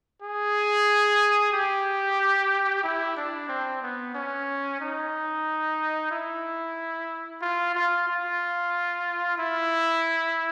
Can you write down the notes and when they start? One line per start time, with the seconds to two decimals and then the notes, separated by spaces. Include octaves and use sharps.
0.22 G#4
1.53 G4
2.84 E4
3.16 D4
3.49 C4
3.82 B3
4.14 C#4
4.81 D#4
6.11 E4
7.41 F4
7.75 F4
8.08 F4
9.38 E4